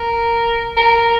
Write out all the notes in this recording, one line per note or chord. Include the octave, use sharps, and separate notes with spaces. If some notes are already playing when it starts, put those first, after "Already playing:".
Already playing: A#4
A#4